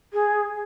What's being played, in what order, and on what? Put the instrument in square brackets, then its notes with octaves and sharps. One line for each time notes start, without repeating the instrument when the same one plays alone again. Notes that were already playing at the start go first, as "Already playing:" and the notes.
[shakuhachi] G#4